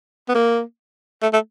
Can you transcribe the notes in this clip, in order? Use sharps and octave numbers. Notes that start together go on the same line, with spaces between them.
B3
A#3
A3
A3